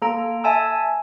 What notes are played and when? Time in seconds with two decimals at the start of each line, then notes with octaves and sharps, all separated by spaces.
0.02 A#3 A4 A#5 D7
0.44 E5 G#5 A5 E6